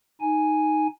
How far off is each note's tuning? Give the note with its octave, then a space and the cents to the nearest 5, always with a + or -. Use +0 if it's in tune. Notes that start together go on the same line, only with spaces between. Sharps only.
D#4 +0 G#5 +0